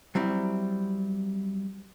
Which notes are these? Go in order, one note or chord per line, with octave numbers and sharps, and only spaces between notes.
F#3 G3 C4 E4